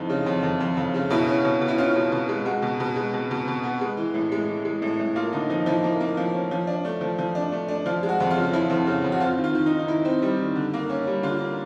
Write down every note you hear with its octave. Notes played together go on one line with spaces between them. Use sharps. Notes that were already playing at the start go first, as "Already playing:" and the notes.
Already playing: F2 E3 D#4
C#3
F2
F2
F2
F2
C#3
B2 E4
C#4
B2
B2
E4
C#4 F4
B2
B2
G#3
G#3 F#4
B2
B2
G#3
B2
B2
B2
B3
G#3
E3
A2
G#3
E3
G#3
A2
A2
A#3 F4
D3 D#4
F3 D#4
F3 E4
A#3
A#3
F3
C#4
F3
D4
A3
F3
F3
D4
A3
D4
F3 F4
G#3
F#4
F2
F4
C#3
F3 E4
F2
C#3
F2
F#4
C4 F4
D#3
F4
D#3
D#4
D#3
D#4
D#3 E4
C4
G3
D#3
D3
A#3
C#4
G3
D3 F4
A#3